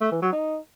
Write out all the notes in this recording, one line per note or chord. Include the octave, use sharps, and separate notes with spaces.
A3
E3
F#3
D#4